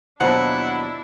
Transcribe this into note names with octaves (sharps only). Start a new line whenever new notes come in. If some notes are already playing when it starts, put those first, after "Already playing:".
D#2 B2 F3 F#3 D4 E4 F#5